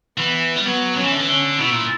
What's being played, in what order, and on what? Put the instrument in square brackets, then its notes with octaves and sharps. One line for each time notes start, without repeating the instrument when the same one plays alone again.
[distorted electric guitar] E3 [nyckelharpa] B3
[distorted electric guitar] G3
[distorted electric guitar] F#3 [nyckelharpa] B3
[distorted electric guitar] F#3 [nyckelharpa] C#4
[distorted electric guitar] E3
D3
E3
[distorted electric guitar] D3 [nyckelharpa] C#4
[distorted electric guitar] B2 [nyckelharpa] E4
[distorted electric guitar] A#2